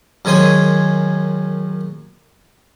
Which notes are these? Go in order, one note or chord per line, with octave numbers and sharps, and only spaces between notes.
F#2 D#3 G#3 C#5 G#5 C6